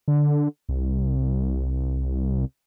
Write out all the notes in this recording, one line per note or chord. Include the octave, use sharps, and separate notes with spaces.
D3
C2